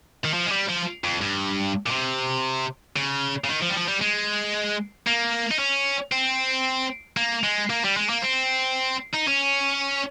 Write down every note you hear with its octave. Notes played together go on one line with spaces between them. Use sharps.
D#3
F3
G#3
G3
F3
F2
G2
A#2
C3
C#3
C#3
D#3
F3
G3
F3
G3
G#3
A#3
D#4
C#4
C4
A#3
G#3
A#3
G3
G#3
A#3
C4
D#4
C#4